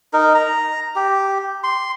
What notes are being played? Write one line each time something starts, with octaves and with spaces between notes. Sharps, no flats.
D#4 A#4
A#5
G4
C6